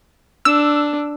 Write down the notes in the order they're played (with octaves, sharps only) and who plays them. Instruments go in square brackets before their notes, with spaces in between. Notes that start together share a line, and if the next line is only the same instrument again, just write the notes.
[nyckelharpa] D4 [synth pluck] E6